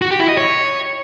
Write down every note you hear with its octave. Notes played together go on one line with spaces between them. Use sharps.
F#4
G4
E4
D#5
C#5